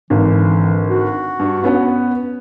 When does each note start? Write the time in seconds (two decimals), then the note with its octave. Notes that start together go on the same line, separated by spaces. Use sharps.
0.10 G#1 D3 E3
0.88 F#4
1.39 G2
1.64 B3 C#4 F#5